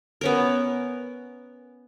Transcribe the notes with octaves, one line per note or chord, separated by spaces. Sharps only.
B3 C#4 A#4